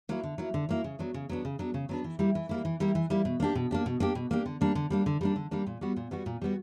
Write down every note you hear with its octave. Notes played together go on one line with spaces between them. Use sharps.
F#3 A#3 E4
D3
F#3 A#3 E4
D3
F#3 A#3 E4
C#3
F#3 B3 D4
C#3
F#3 B3 D4
C#3
F#3 B3 D4
C#3
F#3 B3 D4
E3
G3 A#3 E4
E3
G3 A#3 E4
E3
G3 A#3 E4
E3
G3 A#3 E4
B2
A#3 D4 G4
B2
A#3 D4 G4
B2
A#3 D4 G4
B2
A#3 D4 G4
D3
G3 A#3 D4
D3
G3 A#3 D4
D3
G3 A#3 D4
D3
G3 A#3 D4
A#2
G3 B3 F#4
A#2
G3 B3 F#4
A#2
G3 B3 F#4